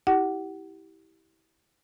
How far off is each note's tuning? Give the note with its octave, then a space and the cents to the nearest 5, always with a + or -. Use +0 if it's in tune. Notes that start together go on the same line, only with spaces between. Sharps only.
E4 -20 G4 -10 F#5 +20